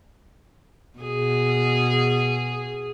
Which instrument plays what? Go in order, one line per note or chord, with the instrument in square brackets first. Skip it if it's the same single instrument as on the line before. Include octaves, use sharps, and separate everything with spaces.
[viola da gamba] B2 G#4